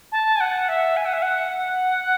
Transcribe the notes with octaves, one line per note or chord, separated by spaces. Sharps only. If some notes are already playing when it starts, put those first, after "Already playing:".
A5
G#5
F#5
E5
G#5
F#5
E5
F#5